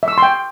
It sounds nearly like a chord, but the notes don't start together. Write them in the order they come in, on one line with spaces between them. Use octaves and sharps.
E5 E6 C#6 C6 G5